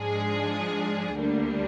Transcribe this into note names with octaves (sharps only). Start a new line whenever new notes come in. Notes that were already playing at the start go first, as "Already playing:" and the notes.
Already playing: G#2 F3 G#3 D4 G#4
D2 D3 G3 A#3 D4